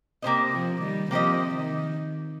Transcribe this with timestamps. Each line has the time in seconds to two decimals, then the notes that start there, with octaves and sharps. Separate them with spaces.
0.22 C3 A#3 G4 C5 D#5
0.52 C3 F3
0.81 D#3 G3
1.11 C3 F3 A#3 G4 C5 D#5
1.55 D#3